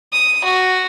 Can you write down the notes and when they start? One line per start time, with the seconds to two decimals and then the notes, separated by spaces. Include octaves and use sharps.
0.13 D#6
0.44 F#4